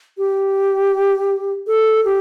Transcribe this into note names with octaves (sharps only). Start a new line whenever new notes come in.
G4
A4
G4